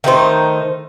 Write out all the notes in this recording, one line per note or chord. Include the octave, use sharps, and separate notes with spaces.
D#3 A3 D#4 C5